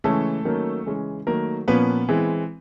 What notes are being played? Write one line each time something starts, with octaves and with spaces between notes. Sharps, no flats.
C#3 E3 G#3 A3 C#4 A4
D#3 F#3 A#3 C#4
C#3 E3 G#3 C#4
D#3 F#3 A3 A#3 A#4
A#2 F3 A#3 B3 C#4 B4
E3 G#3 C4